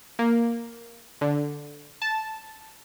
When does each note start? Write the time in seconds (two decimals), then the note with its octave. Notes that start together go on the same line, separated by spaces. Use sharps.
0.19 A#3
1.21 D3
2.02 A5